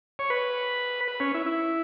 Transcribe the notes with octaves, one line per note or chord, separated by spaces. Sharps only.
C#5
B4
B4
C#4
E4
E4